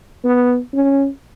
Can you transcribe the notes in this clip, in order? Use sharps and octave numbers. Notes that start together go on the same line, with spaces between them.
B3
C#4